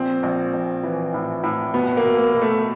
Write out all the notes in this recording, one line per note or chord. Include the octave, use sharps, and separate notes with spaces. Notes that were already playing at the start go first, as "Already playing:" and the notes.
Already playing: A#1 C4
A#1
A#1
E3
A2
A2
B2 B3
A#3
B2
A#3
B2
A3